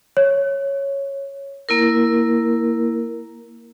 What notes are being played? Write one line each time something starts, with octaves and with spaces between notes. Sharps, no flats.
C#5
A#3 E4 A#4